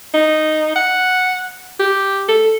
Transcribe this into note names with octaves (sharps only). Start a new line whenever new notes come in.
D#4
F#5
G4
A4